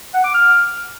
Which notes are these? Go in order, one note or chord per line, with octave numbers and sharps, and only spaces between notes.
F#5
D6
F6